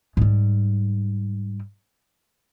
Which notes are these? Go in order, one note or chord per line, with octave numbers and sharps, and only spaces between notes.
G#2 G3